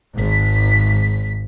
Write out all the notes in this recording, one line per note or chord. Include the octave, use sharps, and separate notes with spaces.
G#1 B6